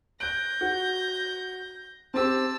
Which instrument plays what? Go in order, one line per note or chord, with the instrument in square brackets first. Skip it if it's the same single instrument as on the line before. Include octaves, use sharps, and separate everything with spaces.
[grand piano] F#6 D7 [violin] G6 A#6
[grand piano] F#4
[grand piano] C4 G4 [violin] A5 E6